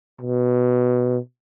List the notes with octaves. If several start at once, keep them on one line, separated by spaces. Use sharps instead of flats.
B2